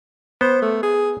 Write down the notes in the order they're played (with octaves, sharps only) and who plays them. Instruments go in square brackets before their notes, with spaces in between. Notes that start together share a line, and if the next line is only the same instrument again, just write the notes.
[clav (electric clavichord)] B3 [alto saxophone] C5
[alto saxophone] A3
G#4